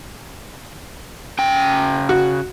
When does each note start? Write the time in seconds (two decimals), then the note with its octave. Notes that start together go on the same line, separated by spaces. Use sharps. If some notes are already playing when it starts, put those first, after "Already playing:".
1.39 C#3 G5
2.09 F#4